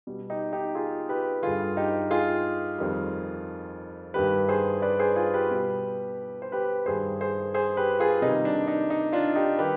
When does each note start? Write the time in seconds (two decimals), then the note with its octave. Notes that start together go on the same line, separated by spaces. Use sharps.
0.07 B2 G3
0.30 D#4 G4
0.53 D#4 G4
0.75 F4 G#4
1.09 G4 B4
1.43 G2 D3 G3 F4 G#4
1.77 D#4 G4
2.11 F4 G#4
2.78 F2 D#3 G3
4.14 G2 D#3 G3 G4 B4
4.49 G#4 C5
4.82 B4 D5
4.99 G#4 C5
5.16 F4 G#4
5.34 G4 B4
5.51 B2 G3
6.42 C5
6.52 G4 B4
6.86 G2 D#3 G3 G#4 C5
7.21 G#4 C5
7.54 G#4 C5
7.77 G4 B4
8.00 F4 G#4
8.22 C3 D#3 G3 D#4
8.45 D4
8.67 D#4
8.90 D#4
9.12 D4 F4
9.36 D#4 G4
9.58 D#3 G3 G4 B4